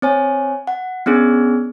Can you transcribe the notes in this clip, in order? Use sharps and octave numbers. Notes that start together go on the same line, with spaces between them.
C4 C#5 G#5
F#5
B3 C#4 D4 G#4